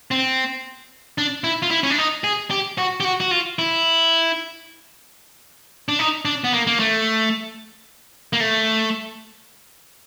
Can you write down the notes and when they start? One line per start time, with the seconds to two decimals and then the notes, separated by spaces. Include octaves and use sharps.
0.11 C4
1.18 D4
1.44 E4
1.62 F4
1.71 E4
1.83 C#4
1.90 D4
1.98 D#4
2.24 G#4
2.51 G4
2.78 F#4
3.00 G4
3.05 F#4
3.20 F#4
3.31 F4
3.59 E4
5.89 D4
5.99 D#4
6.25 D4
6.44 B3
6.53 A#3
6.67 A#3
6.80 A3
8.33 A#3
8.40 A3